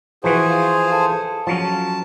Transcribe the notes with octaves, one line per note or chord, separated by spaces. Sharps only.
E3 F3 F#4 G#4 C5
F4
A4
F3 F#3 C#4 A5